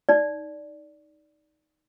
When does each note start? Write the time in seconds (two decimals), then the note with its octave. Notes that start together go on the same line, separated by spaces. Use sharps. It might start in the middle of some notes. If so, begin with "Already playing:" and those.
0.09 D#4 D5